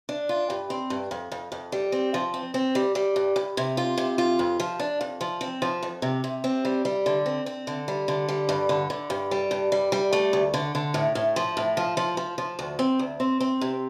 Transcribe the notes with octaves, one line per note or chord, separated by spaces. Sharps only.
D4
F4
G2
C4
G2
F2
F2
F2
G3
C4
F3
C4
C4
G3
G3
G2
G2
C3
F4
C3
F4
F2
F3
D4
F2
F3
C4
F3
F2
C3
C3
C4
G3
G3
D3
C4
C4
D3
G3
D3
G3
G2
D3
D3
G2
G3
G2
G3
G3
A3
D2
D3
D3
A2
A2
F3
A2
F3
F3
F3
F3
D2
C4
D2
C4
C4
C3